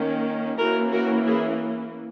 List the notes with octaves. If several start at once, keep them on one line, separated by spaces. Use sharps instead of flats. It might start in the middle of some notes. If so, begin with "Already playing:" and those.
Already playing: D#3 A#3 C#4
E3 A#3 C#4 F#4 A#4
F#4 A#4
E4 G#4